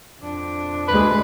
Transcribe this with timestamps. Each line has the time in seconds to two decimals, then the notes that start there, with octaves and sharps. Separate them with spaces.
0.21 F2 D4
0.88 D2 G#3 B4